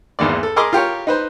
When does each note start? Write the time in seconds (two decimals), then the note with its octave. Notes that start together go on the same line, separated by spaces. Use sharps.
0.19 G#1 E2 A#3 D5
0.43 A4
0.56 G#4 A#4 D#5 B5 C6 D6
0.73 F4 G4 A#4 C#5
1.07 D#4 B4 C5